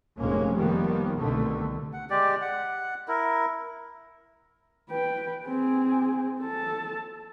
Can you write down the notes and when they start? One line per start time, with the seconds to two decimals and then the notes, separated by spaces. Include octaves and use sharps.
0.19 F1 F2 A#2 G#3 A#3 C#4
0.55 D#3 F3 G3 A#3 B3
1.17 C2 B2 D3 D#3 A3
1.93 F#5
2.10 G#3 G4 D5
2.42 F#5
3.08 E4 A#4
4.90 B4 G5
5.46 C4 G#4
6.41 A4 A5